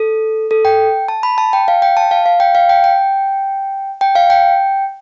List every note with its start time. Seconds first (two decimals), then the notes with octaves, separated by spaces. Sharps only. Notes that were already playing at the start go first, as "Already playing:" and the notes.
Already playing: A4
0.51 A4
0.65 G5
1.08 A5
1.23 B5
1.38 A5
1.53 G5
1.68 F5
1.82 G5
1.97 A5
2.11 F5
2.26 F5
2.40 G5
2.55 F5
2.69 G5
2.84 G5
4.01 G5
4.15 F5
4.30 G5